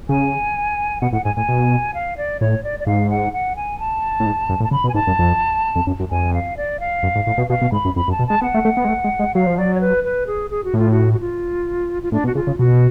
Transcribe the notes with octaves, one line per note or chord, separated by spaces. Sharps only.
C#3 G#5
B2 F#5
A2 F#5
G#2 G#5
A2 G#5
B2
F5
D5
A2 C#5
D5
D5
G#2 F5
F#5
F#5
G#5
A5
A2
G#2
F#2
A2
A5
C#3 B5
B2
G#5
G#2 A5
F#2
F2
F2
F#2
F#2
F2 G#5
F5
D5
F5
F#2
G#2
A2
B2
B2 F5
B2
G#2 B5
F#2
F2 B5
F#2
A5
B2
G#3 A5
B3 F#5
A3
A3
B3
G#3
A3
G#3
G#3
F#3 F5
F3
F#3 D5
C#5
B4
B4
G#4
G#4
F#4
A2 F4
F#4
F#4
F4
F4
A2 D4
B2 F#4
C#3 F4
C#3
B2 F#4